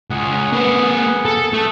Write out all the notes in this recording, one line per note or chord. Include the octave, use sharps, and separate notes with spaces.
C#2 G#4 F#5
A#3 B4
A4
A3 A4 E6